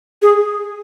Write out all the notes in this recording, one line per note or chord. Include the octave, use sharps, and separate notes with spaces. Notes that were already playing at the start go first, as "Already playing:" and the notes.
G#4